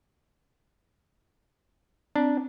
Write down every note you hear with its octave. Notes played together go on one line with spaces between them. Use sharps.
C4 D4